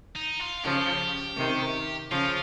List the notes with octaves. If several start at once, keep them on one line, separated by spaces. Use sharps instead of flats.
D#4
F4
C#3 F3 G4
C3 D#3
C#3 F3 F4